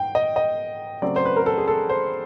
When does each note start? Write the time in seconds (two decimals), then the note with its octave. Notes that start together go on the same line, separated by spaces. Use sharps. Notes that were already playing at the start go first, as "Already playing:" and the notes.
Already playing: G#2 G5
0.15 D#5
0.36 D#5
1.02 C#3 F#3 A3 C4 D5
1.16 C5
1.25 B4
1.36 A#4
1.46 A4
1.58 G#4
1.68 A4
1.89 C5